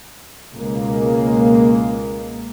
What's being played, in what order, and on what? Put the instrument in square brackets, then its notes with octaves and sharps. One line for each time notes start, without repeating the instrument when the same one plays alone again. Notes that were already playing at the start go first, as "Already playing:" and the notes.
[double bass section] C#2 B2 G#3 A#3